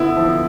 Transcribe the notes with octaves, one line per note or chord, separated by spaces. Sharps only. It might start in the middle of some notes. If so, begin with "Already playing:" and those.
Already playing: D3 B3 E4
F3